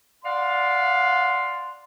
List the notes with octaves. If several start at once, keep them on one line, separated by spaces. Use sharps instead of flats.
D5 F5 F#5 C6